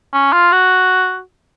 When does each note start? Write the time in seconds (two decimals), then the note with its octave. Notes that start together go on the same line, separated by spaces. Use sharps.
0.13 C#4
0.33 F4
0.52 F#4